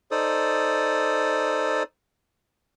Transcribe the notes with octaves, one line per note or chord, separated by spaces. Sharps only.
D#4 A4 C5 D5 D#6